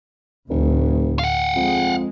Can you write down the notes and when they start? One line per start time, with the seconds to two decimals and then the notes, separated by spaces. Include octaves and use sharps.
0.50 F1 D2 A2
1.19 F5 F#5
1.56 F2 G#3